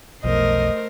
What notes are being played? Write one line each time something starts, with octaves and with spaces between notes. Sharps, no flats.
F1 B1 F2 A3 A#4 C5 D#5